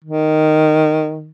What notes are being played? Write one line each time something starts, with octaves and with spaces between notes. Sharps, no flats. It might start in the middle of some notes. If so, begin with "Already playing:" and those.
D#3